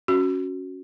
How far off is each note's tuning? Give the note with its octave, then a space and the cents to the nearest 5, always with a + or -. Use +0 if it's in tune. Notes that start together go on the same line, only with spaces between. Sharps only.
C#4 -5 F#4 +0